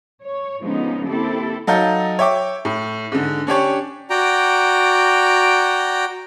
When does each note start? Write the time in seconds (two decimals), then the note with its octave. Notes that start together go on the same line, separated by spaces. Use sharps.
0.21 C#5
0.62 D3 F3 G#3 B3 C#4 D#4
1.06 A#3 C4 E4 G4 A4
1.67 F#3 D#4 A4 F5 A#5 G6
2.19 C#5 E5 G5 D6
2.65 A2
3.12 G#2 D3
3.47 C#4 D4 G4 C#5
4.10 F#4 D5 G5 A#5